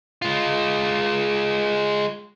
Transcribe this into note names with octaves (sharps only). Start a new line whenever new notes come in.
G#3 F4